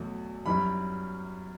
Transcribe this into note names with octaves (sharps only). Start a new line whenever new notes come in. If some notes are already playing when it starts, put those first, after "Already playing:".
Already playing: E2 B2 F#3 A3
F#2 E3 G3 B5